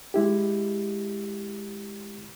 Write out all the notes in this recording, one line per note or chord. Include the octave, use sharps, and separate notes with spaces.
G#3 E4 G4